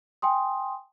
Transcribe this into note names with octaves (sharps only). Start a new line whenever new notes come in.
G5 G#5 C6 D#6